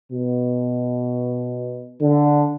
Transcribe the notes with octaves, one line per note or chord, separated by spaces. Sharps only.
B2
D3